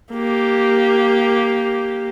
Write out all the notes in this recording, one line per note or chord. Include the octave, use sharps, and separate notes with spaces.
A#3 G4